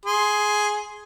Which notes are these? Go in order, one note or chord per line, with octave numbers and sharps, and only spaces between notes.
G#4 C6